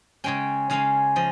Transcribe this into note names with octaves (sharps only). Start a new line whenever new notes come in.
C#3 G#3 C#4 G5
C#3 G#3 C#4 F5
F3 D#5